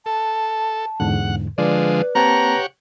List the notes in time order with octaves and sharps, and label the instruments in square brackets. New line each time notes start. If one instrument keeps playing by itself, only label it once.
[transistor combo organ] A4 [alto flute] A5
[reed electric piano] E2 G#2 D3 [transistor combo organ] F#5
[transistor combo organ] D3 F3 G#3 [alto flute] B4 [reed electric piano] D5
[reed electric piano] A#3 C4 A5 [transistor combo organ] G4 C#5 F#5 [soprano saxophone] A#5